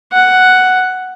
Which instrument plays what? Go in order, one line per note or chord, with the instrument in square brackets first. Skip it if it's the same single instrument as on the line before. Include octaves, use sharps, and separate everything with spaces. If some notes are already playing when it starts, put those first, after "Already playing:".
[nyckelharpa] F#5